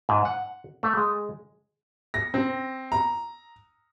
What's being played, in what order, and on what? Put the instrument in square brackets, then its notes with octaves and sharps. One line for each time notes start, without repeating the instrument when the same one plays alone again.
[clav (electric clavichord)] G#2
F#5
A3
G#3
[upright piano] A#6
C4
A#5